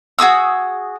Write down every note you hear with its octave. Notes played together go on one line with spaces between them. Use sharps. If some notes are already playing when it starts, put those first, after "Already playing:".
F#4 G#4 D#6 E6